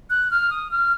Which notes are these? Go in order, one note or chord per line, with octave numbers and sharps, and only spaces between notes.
F#6
F6
D#6
F6